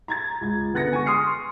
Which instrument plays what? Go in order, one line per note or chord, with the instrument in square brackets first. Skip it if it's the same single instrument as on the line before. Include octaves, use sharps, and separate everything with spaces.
[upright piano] A#5 G#6 A6
C#2 G#6
D3 B3 F#6 A6 A#6 C#7
G#5 C#6
C6 C#6 D#6 F6 C7 C#7